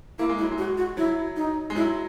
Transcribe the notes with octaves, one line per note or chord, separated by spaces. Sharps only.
A#3 E4
G#3
F#3 E4
G#3
F#4
F#4
F#3 E4
D#4
G#3
F#3 E4